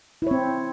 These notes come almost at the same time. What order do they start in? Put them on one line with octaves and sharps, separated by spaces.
E4 C#5 C4